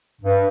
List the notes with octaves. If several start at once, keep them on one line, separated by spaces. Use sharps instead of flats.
G2